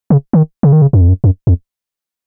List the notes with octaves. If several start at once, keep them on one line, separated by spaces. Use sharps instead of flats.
C#3
D#3
C#3
D#3
C#3
F#2
F2
F#2
F#2
F2